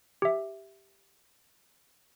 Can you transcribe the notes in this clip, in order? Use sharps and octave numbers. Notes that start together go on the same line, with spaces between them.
G4 E5